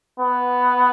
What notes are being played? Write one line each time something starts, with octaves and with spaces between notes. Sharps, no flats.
B3